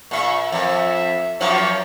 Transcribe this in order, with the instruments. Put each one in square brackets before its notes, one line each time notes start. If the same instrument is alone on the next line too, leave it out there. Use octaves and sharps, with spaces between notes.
[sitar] A#2 E5 [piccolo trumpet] C#6
[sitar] F2 [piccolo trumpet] E5
[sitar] F#2 F3 F#3 [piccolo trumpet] C#6